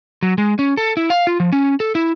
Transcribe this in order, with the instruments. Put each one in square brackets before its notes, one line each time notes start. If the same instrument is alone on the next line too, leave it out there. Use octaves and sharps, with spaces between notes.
[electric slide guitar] F#3
G#3
C#4
A4
E4
F5
F4
F3
C#4
A4
E4